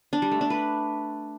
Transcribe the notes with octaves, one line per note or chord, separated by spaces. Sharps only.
D4
G3
A3
D4
B4